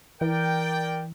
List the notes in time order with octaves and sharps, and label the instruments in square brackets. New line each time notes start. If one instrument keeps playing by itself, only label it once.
[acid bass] E3 [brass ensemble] A#4 D5 G5